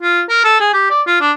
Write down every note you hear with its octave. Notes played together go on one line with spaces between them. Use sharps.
F4
A#4
A4
G#4
G4
D5
F4
D4